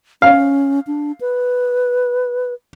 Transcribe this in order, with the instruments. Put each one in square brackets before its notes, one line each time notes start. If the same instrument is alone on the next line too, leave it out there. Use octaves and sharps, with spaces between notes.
[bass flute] C#4 [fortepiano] F5
[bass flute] D4
B4